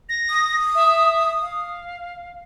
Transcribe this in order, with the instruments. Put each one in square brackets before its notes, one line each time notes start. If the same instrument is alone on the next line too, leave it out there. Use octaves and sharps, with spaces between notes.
[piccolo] A#6
[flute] D#6
[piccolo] E5
F5